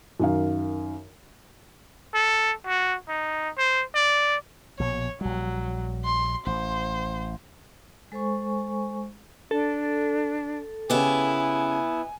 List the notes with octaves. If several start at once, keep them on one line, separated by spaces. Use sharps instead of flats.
F#2 D#3 F5
A4
F#4
D#4
C5
D5
A#1 B2 C#5
A#1 F#3 G3
C6
A1 C5
G#3 A4 C5 G#5 C#6
D4 A4
C#3 B3 E4 G4 G#5